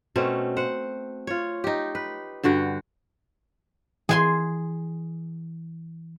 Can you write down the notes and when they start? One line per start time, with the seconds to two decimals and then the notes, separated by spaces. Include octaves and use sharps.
0.16 B2 A3 C4 C#4
0.57 C5 F#5
1.27 F4 C#5
1.64 D#4 G4
1.95 B4
2.43 G2 D3 F#4 G5
4.09 E3 G#4 G#5 C6